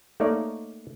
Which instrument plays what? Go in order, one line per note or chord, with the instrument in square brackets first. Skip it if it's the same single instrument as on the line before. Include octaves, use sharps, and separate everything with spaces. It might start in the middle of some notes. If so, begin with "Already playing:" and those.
[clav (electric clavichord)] A3 A#3 D#4 A#4 C#5 D5